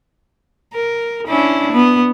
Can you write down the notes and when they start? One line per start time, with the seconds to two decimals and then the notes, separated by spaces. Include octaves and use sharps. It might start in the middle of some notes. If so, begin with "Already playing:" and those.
0.73 A#4
1.28 C#4 D4 E4
1.72 B3